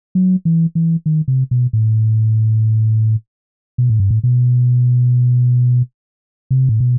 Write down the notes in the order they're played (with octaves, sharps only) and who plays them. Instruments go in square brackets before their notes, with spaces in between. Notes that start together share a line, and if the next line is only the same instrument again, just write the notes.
[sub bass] F#3
E3
E3
D#3
C3
B2
A2
B2
A2
G2
A2
B2
C3
A2
B2